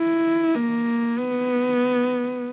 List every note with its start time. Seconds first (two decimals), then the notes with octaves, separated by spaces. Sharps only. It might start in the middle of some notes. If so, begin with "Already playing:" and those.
Already playing: E4
0.55 A#3
1.18 B3